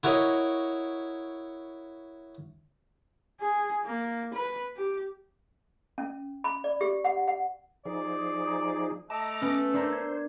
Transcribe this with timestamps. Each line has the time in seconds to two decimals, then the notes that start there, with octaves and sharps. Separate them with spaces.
0.03 E4 F#4 A#4 C#5 D#5
3.41 G#4
3.86 A#3
4.34 B4
4.77 G4
5.98 C#4
6.44 B5
6.64 D5
6.81 G4
7.04 F#5
7.28 F#5
7.85 F3 D#4 G#4 D5
9.10 A3 D#5 A5 A#5 D6
9.42 B3 C#4
9.74 D4 A#4 C5
9.92 G#6